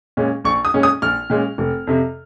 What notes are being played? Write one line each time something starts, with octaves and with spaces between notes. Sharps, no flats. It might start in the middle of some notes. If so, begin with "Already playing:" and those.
A#2 G#3 C#4
A#1 C#6
D#6
A#2 G#3 C#4
D#6
A#1 F6
A#2 G#3 C#4
F1
F2 C3